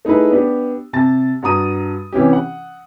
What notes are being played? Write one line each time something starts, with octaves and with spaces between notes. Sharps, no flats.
A3 D#4 E4 G#4 B4
B3 D4 G4
C3 A5 A6
G2 F#4 A#5 D#6 D#7
C3 E3 C#4 G4
F#5